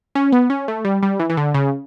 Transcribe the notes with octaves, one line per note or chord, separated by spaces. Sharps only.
C#4
B3
C#4
A3
G3
G3
E3
E3
D3
C#3